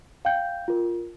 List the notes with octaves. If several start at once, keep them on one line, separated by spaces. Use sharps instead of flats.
F5 G5 G6
F4 A#4